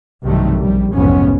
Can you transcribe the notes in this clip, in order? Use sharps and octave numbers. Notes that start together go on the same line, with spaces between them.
B1 G2 C3 D#3 G3 A3
A#1 G3
F1 B1 G#2 F#3 B3 C#4